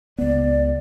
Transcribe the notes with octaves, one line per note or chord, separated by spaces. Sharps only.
C#2 B3 D5